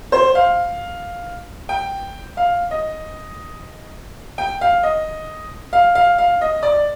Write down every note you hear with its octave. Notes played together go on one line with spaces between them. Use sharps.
C5
F5
G5
F5
D#5
G5
F5
D#5
F5
F5
F5
D#5
D5